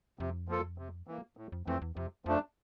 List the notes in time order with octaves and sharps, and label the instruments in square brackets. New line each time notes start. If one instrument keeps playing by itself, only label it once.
[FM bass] F2 [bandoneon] C3
[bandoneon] F3 A#3 F4 A4
C3
E3 A#3
A2
[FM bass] F2
[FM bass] F2 [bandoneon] E3 A3 C4
[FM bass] E2
[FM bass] F2 [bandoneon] C3
[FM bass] F2 [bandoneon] F3 A3 D4